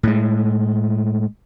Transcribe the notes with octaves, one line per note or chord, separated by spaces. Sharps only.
A2 G#3